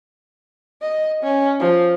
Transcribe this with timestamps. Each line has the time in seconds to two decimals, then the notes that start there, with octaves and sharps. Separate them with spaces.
0.82 D#5
1.23 C#4
1.60 F3